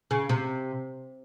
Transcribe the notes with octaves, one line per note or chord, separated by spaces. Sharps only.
C#3
C3